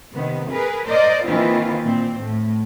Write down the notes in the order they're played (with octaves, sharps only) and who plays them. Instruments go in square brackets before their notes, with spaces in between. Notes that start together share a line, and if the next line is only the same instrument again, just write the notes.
[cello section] C3 D#3 B3
G#4 A#4 B4
A#4 C5 D5 D#5
D#3 E3 A#3 C4 E4 F4
A#2 C4
A2